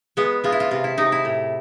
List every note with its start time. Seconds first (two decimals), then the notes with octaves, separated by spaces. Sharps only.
0.17 G#3 B3
0.44 G#3 F4
0.52 E4
0.60 F4
0.71 C3 F4
0.84 E4
0.98 C3 D#4
1.12 E4
1.25 A2